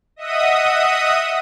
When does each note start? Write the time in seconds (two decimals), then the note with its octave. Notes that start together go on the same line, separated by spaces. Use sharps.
0.16 D#5 E5 F#5 D#6